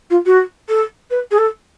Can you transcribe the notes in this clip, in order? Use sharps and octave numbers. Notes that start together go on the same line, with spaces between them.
F4
F#4
A4
B4
G#4
A4